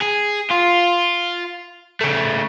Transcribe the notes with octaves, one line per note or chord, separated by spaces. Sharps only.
G#4
F4
C#3 A3